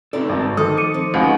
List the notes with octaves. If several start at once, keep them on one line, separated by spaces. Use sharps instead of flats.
C4 D#4 A4 D5
G#1 G2 F#4 A5
D#3 F3 A4 D#6
D6 C#7 D#7
C4
C#2 D#4 F#4 G#4 F5 F#5